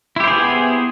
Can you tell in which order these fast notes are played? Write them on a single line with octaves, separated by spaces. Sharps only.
E4 G4 C5 G#4 B3